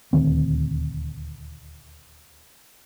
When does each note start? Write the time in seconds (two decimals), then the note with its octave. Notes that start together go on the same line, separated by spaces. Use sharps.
0.13 D#1 D2 D#3 C4